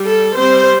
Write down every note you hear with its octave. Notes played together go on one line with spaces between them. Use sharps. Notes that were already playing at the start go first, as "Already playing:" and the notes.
Already playing: G3
A4
G3 C4 C5